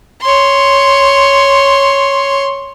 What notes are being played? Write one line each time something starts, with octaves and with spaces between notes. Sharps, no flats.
C#5 C6